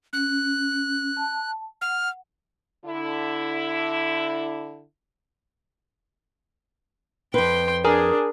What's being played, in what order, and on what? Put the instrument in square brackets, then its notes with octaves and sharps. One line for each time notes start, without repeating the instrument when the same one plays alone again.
[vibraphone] C#4 [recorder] F#6
[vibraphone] A5
[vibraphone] F#5 [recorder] F6
[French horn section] D3 E4
[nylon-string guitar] F2 B4 [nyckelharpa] G5 C6
[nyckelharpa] D4 [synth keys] G#4 [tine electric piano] A#4